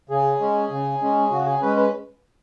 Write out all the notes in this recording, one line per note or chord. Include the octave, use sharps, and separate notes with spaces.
C#3 G#4
G#3 C#4
C#3
G#3 C#4
C#3 F#4
G#4
G#3 C#4 B4
B4